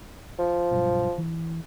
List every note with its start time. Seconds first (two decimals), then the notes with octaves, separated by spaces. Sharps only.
0.39 F3
0.71 B1 G2 B2
1.18 E3